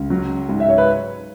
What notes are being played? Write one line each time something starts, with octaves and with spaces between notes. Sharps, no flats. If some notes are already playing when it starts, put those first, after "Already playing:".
Already playing: C#2
F#3
G#2
E5
C#5
B4